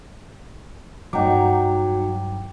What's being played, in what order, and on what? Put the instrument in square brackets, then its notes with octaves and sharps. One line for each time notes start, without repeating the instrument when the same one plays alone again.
[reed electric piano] G2 G5 D6 [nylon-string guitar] F#3 D#4